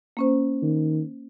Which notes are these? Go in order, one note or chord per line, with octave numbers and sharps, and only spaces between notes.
A#3 C#4 C5
D#3